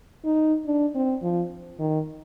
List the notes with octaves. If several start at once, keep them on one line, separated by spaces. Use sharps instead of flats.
D#4
D4
C4
F3
D#3